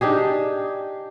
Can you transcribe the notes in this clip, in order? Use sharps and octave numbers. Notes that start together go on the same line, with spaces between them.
D4 D#4 G4 G#4